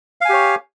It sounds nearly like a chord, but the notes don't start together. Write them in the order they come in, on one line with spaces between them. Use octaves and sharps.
F5 G#5 G4 C#5